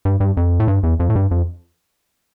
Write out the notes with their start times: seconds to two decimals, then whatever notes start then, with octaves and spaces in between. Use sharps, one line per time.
0.05 G2
0.20 G2
0.37 F2
0.60 A2
0.68 G2
0.83 E2
1.00 F2
1.10 A2
1.16 G2
1.31 F2